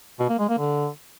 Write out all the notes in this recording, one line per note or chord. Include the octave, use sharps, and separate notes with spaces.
B2
A#3
G#3
A#3
D3